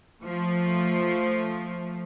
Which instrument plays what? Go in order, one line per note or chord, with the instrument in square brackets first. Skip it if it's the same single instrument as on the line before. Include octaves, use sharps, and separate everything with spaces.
[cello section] F3 A3